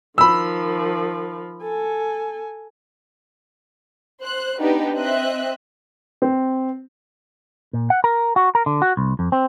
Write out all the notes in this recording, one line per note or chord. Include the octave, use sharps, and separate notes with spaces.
D#3 F3 B5 E6
A4 G#5
C5 F#6
B3 D4 D#4 G4 B4
C4 D#5 E5 F#6
C4
A#2
F#5
A#4
F#4
A#4
D3
F#4
C2
F2
C4